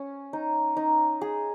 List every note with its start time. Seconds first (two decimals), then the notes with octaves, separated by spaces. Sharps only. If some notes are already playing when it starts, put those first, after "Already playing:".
Already playing: C#4
0.33 D#4
0.77 D#4
1.21 G#4